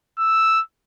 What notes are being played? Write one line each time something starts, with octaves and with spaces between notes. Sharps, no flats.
E6